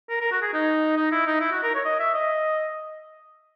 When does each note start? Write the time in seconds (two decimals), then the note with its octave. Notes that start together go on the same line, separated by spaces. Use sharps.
0.09 A#4
0.20 A#4
0.31 F#4
0.42 G#4
0.53 D#4
0.96 D#4
1.12 E4
1.27 D#4
1.41 E4
1.52 F#4
1.63 A#4
1.75 C#5
1.85 D#5
2.00 E5
2.14 D#5